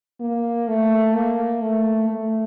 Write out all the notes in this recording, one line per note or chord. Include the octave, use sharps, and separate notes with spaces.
A#3
A3
A#3
A3
A3